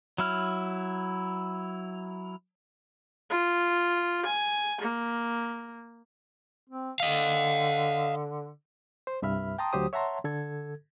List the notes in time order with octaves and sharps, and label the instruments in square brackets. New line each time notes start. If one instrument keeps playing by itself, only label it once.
[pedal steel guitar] F#3 E4 F6
[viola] F4
G#5
A#3
[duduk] C4
[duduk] D3 [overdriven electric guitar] D#5 F5
[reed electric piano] C5
C2 G2 E5 B5 F6
G5 A5 A#5 C6 D#6
D2 F#3 G4 C5 D#6
C#5 E5 F#5 A5 A#5 C6
D3 A4 G#6